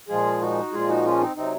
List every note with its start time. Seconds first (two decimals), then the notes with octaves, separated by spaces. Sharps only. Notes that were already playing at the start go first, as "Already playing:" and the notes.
0.08 A#2 F3 G#3 F4 G#4
0.41 D#4 F#4
0.72 A#2 F3 G#3 F4 G#4
0.89 D#4 F#4
1.05 C#4 F4
1.21 C4 D#4
1.36 C3 F#3 C4 D#4